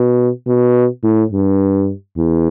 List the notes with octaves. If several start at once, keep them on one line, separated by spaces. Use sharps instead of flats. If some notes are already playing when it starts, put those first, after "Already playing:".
Already playing: B2
B2
A2
G2
E2